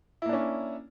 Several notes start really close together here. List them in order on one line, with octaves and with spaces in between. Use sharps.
E4 A#3 D4 C#4